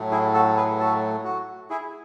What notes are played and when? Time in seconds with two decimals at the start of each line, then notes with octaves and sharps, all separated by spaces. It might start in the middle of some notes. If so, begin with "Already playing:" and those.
Already playing: A2 F#3 A3
0.11 E4 G#4
0.34 F#4 A4
0.57 G#4 B4
0.80 F#4 A4
1.24 F#4
1.70 E4 G#4